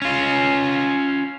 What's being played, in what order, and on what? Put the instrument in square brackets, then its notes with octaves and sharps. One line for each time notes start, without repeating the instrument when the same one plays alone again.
[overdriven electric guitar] C#4 F4